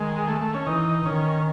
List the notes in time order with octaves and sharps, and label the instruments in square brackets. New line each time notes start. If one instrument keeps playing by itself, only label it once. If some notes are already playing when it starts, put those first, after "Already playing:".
Already playing: [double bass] D#3 [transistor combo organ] G#3
[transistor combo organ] A3
A3
C#4
[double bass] E3 [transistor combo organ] D#4
[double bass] D#3 [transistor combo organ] C#4